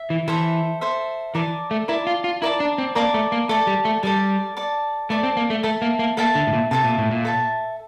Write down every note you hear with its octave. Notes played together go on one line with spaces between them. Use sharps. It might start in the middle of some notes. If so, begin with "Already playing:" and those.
Already playing: E5
E3
E3 A4 C5 E5
A4 C5 E5
E3 A#4 D5 A5 D6
A3
E4 A#4 D5 A5 D6
F4
F4
E4 A#4 D5 A5 D6
D4
C4
A#3 A#4 D5 A5 D6
A3
A#3
A3 A4 D5 A5
G3
A3
G3 A4 D5 A5
A4 D5 A5
A3 A4 D5 A5
C4
A#3
A3
A3 A4 E5 A5
A#3
A#3
A#3 A4 E5 A5
D3
A2
A#2
C3 A4 E5 A5
A#2
A2
A#2
A4 E5 A5